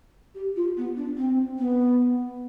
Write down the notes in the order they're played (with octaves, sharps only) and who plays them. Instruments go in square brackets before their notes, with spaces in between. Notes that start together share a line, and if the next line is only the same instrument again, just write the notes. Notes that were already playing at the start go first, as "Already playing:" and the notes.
[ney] G4
F4
B3
D4
C4
B3